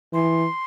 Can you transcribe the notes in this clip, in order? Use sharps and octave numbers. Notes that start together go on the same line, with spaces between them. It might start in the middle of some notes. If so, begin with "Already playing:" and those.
E3 C6